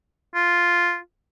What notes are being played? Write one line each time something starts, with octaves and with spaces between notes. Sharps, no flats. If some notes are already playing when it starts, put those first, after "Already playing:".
F4